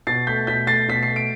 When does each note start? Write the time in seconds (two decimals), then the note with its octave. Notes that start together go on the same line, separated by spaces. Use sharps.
0.07 B2 A6 C7
0.27 A3 G6 B6
0.47 B2 G6 B6
0.67 A3 A6 C7
0.88 B2 B6
1.03 C7
1.08 A3
1.16 D7